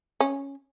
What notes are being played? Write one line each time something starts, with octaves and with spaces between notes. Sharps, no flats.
C#4